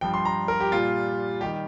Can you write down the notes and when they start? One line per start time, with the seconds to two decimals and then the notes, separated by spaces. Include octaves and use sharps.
0.01 G2 F3 G5
0.14 C6
0.25 A#5
0.48 A#4
0.60 G4
0.72 A#2 G3 F4
1.41 D#3 G3 G4